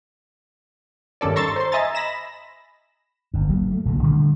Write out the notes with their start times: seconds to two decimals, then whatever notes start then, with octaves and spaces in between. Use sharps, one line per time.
1.21 G2 D#3 C#4 A4 D5
1.36 A#5 C6 C#6 E6 A6
1.56 C5 C6
1.72 D#5 E5 G#5 A#5 A6
1.95 B5 A#6 E7
3.34 G1 G2
3.49 D2 F#3 A#3
3.71 A3
3.86 C2 A#2 D3 F#3
4.03 D3 G3 A3